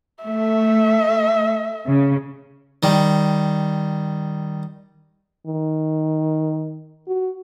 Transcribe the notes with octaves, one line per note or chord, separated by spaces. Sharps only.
A3 E5
C#3
D#3 G3
D#3
F#4